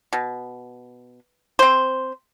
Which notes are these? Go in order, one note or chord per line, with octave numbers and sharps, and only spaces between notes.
B2
C4 C5